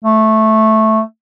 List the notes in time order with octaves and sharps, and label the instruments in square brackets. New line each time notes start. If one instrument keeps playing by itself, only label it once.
[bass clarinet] A3